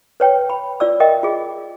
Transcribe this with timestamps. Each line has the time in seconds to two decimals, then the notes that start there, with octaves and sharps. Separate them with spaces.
0.20 B4 C#5 G5
0.50 B5
0.80 F4 D5 E6
1.00 A#4 D#5 E5 G5
1.23 F4 G#4